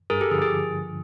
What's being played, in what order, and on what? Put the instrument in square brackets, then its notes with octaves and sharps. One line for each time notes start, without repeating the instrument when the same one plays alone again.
[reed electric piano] G2 [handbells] G#4 A#4
[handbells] G4 A4
[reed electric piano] D3 F3 [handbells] G#4
[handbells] G#4